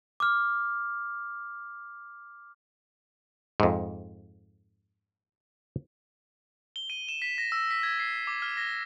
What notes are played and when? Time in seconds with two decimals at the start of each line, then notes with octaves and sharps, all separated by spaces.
0.20 D6 F6
3.60 F2 G#2
6.76 G7
6.90 D#7
7.09 E7
7.22 B6
7.38 A#6
7.52 E6
7.71 B6
7.83 G#6
8.00 C7
8.27 D6
8.42 F6
8.57 A#6